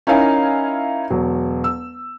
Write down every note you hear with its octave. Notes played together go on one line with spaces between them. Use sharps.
C#4 D#4 E4 A#4 F5 G#5
E1 F#3
E6